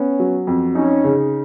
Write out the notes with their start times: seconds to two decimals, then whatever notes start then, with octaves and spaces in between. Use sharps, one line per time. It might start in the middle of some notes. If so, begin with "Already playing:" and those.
Already playing: B3 C#4
0.19 F#3
0.47 F2
0.75 C#4 D#4
1.04 C#3